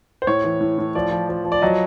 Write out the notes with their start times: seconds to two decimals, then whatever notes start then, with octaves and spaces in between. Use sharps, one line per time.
0.22 C5
0.27 A2 C#5
0.44 E3
0.61 A2
0.78 A2
0.95 F3 D5
1.11 F3
1.29 F3
1.45 F3
1.52 D5
1.62 F#3 D#5